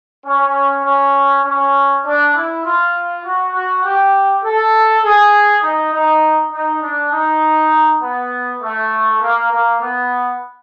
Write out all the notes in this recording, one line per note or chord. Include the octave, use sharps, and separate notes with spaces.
C#4
C#4
C#4
D4
E4
F4
F#4
F#4
G4
A4
G#4
D#4
D#4
D#4
D4
D#4
B3
A3
A#3
A#3
B3